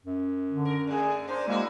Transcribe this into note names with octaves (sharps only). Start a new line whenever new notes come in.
F#2
D3
A#4
D3 A3 G#4
A#3 D4 D#4 C5
G#3 A#3 E4 F#4 G#4